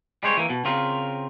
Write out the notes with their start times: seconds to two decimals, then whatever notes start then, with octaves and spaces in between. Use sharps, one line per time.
0.23 G3 G#3 C5 C#5
0.37 E3 A#3
0.50 B2
0.65 C#3 C4 F4 A#4